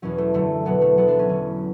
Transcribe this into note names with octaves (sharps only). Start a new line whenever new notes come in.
E2 B2 F#3 C#4
A3
F#2 D3 F#3 A3
E2 B2 F#3 B3
A3
D2 D3 F#3 B3
D4
C#4
E2 D3 F#3